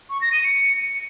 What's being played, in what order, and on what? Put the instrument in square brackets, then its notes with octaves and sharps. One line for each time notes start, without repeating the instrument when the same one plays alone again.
[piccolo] C#6
A#6
D#7
C#7